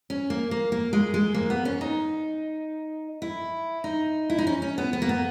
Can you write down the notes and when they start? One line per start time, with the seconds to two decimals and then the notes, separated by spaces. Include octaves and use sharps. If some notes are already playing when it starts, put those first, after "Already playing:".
0.10 C#4
0.30 A#3
0.51 A#3
0.72 A#3
0.93 G#3
1.14 G#3
1.34 A#3
1.50 B3
1.65 C#4
1.81 D#4
3.22 E4
3.84 D#4
4.30 E4
4.38 D#4
4.47 C#4
4.62 C#4
4.78 B3
4.93 B3
5.02 A#3
5.09 B3